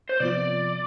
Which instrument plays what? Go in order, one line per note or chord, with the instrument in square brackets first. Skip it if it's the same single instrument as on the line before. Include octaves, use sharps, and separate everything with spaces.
[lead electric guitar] C5
[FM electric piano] C3 F3 B3 F4 [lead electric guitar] D5